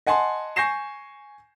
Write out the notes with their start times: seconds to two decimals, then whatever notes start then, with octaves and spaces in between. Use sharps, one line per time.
0.07 D#5 F#5 G#5 A5 C6
0.56 G#5 C#6 G6 A#6 C7 E7